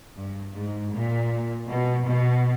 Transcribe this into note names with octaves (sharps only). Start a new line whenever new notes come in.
G2
G#2
A#2
B2
B2